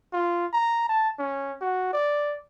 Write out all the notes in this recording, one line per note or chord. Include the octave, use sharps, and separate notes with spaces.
F4
A#5
A5
C#4
F#4
D5